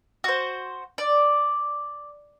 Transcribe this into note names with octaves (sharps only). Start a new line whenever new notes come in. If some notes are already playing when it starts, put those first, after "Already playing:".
F#4 C5
D5